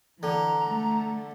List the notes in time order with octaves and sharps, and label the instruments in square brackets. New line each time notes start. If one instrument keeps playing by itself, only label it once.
[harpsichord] D3 [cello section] E3 [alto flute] A#5
[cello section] A3